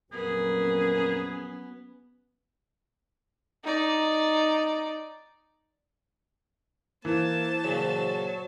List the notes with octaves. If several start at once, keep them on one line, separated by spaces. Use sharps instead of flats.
F2 A#2 F#3 B3 C#4 G#4 A#4
D#4 D5
E3 A#3 C5 A5
A#2 C#3 F#3